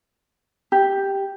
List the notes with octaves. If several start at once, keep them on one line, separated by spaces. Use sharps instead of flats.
G4